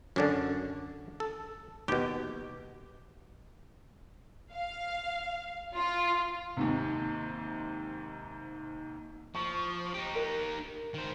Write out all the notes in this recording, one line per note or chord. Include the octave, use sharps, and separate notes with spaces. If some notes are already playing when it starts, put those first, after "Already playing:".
F#2 D3 C#4 D4
A4
D#2 B2 G4
F5
F4
D#2 G#2 C3
F3 C#6
D#4 G4
A#4
D#3 C5